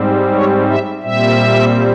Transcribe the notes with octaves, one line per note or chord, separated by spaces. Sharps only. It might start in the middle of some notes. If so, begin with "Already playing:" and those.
Already playing: G#2 G3 C4
C#5
E5
A#2 G3 C4 E5